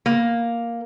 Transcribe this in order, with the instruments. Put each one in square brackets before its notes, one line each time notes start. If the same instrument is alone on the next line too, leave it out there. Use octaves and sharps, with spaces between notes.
[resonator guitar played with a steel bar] A#3